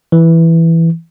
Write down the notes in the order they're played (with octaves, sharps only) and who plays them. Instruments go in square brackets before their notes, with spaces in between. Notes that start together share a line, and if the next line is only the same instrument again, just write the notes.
[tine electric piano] E3